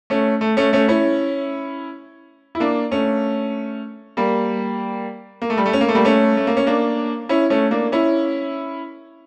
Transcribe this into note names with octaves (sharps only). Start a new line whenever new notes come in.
A3 C#4
A3
A3 C#4
A3 C#4
C#4 E4
E4
A#3 D4
A3 C#4
G3 A#3
A#3
A3
G3
A3
C#4
A#3
A3
G3 A#3
A3 C#4
A3
A#3
C#4
A#3 D4
C#4 E4
A3 C#4
A#3 D4
C#4 E4